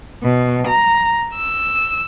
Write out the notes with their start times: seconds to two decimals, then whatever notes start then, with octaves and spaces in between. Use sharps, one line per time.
0.23 B2
0.67 A#5
1.36 E6